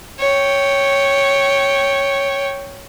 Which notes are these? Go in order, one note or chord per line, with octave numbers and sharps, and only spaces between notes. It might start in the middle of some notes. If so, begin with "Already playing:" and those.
C#5 G5